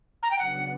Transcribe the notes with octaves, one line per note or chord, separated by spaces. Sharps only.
A#5
G5
C#3 F#3 B3 D4 F#5